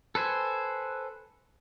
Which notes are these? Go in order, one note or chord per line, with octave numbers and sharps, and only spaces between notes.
A4 B4 C5 G#5